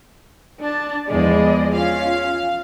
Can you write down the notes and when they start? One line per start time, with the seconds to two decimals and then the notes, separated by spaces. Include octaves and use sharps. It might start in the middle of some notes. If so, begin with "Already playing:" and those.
0.60 D4 A5
1.08 E2 F3 G#3 D5 D#5
1.74 C#4 F4 F5